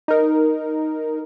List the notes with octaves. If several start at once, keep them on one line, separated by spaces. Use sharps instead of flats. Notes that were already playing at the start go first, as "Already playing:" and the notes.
D#4 A#4